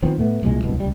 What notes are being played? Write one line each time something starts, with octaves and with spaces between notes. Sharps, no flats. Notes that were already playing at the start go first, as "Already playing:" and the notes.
D#3 F3 B3 C4
A2 A3 B3
C2 A#2 G3 G#3
D1 C2 B2
C#2 G3